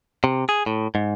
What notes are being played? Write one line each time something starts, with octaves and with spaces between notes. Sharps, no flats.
C3
G#4
A2
G#2